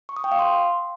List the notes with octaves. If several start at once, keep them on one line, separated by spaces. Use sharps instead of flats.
C#6
D#6
G5
F5
C6